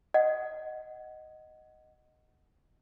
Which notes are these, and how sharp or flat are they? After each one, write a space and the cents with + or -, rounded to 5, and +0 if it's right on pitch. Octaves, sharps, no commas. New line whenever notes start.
D#5 +0 F#5 +10